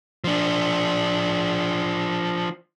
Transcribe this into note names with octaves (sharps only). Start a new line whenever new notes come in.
F3 D4